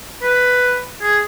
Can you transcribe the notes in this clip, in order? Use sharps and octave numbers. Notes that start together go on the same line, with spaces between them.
B4
G#4